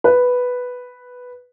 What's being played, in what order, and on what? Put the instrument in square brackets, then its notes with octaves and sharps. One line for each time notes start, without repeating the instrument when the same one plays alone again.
[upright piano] B4